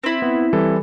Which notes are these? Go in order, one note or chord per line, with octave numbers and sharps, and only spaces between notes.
C4 E4
B3
E3 G3 A4